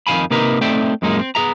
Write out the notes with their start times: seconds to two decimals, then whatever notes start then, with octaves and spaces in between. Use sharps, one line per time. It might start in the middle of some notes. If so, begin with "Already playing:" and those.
0.07 F2 D#3 E3 F5 G#5 B5
0.31 C3 A#3 D#4 A#4 B4 A#5
0.61 A3 C4 D#4 D5 E5 G5
1.02 F#2 A#2 G#3 A#3 D#4
1.19 C4
1.35 B3 G#4 E5 A#5